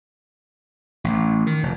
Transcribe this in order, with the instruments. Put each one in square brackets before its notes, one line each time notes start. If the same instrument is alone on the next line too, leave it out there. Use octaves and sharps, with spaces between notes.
[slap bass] A1
D#3
F1